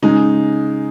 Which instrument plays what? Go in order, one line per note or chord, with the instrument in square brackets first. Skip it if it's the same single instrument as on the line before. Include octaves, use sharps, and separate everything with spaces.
[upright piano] C#3 G#3 D#4